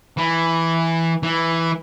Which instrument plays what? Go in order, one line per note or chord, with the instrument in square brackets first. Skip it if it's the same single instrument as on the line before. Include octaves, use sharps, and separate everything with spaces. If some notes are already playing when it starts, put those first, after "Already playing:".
[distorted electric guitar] E3
E3